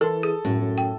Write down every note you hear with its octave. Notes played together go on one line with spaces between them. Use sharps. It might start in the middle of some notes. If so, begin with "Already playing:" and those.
E3 E4 A4 A#4
G#4
F#2 A2
F#2
G5